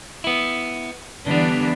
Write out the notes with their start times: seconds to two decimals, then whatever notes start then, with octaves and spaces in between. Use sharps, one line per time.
0.24 B3 E4
1.26 D3 E3 G3 B3 D4